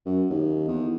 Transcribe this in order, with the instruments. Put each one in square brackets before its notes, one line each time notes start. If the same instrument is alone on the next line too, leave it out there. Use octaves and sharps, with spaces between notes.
[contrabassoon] F#2
D#2
E2